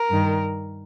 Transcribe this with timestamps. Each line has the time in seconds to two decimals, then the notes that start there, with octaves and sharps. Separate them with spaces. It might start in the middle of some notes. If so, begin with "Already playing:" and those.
Already playing: A#4
0.09 G2 D#3